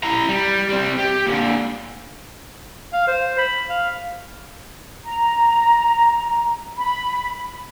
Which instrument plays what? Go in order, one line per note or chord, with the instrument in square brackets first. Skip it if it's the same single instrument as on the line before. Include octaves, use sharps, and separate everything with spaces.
[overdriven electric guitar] E4 A#5
G3
G3 C4
G4
A#2 D3
[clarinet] F5
C5
B5
F5
[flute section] A#5
B5